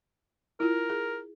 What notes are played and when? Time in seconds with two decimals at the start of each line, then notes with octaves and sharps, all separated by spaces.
0.60 E4 F4 A#4
0.90 G#4